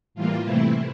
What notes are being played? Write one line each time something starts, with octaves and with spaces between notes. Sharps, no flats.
A2 E3 G3 A#3 F4
C3 E3 A3 C4 E4